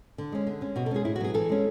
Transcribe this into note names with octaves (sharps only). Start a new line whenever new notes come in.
D3
G#3 C#4
D3
G#3 C#4
B2 F#4
A4
G#3 C#4 G#4
A2 E4
F#4
F#3 B3 G#4
E3 A4
G#3 C#4